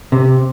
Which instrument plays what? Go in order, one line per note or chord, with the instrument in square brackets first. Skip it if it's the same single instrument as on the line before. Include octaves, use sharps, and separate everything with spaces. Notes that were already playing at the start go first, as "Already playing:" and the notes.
[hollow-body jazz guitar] C3